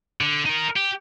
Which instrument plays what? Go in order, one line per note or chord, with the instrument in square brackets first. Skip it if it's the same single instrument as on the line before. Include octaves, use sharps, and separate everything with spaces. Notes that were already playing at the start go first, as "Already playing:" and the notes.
[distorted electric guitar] D3
D#4 A#4
G4